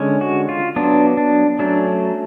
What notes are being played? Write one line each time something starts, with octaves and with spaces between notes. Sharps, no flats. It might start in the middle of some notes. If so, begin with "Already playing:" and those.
Already playing: D3 G#3 C#4
F#4
F4
F#3 B3 D4
D4
F#3 A3 C#4 D4